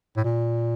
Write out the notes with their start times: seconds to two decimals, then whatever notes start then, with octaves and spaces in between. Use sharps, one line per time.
0.17 A2
0.24 A#2